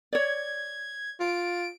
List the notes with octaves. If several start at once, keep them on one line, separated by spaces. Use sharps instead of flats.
C#5 D5 G#6
F4 D7